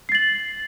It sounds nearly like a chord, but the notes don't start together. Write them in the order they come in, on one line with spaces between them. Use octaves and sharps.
C7 A6 F#7